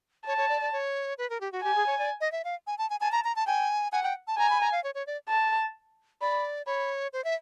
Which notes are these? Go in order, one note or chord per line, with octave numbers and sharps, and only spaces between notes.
C#5 A5
C#5
D5
D5
C#5
B4
A#4
G4
F#4
G4 G#5
G#4
C#5
D5
D#5
E5
F5
G#5
A5
G#5
G#5 A5
A#5
A#5
A5
G5 G#5
F#5 G#5
G5
A5
G#5 A#5
B5
A#5
F5
C#5
C#5
D5
A5
D5 B5
C#5 B5
C5
E5